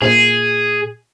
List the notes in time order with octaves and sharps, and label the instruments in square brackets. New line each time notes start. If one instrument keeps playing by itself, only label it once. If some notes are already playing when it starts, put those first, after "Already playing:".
[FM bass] A#2 [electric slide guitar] G#4